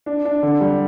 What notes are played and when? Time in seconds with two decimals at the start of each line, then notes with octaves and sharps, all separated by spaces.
0.06 D4
0.25 D4
0.43 D3
0.61 G3